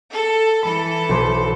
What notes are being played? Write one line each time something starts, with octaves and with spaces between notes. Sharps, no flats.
A4
E3 A4 B5
B1 C5 B5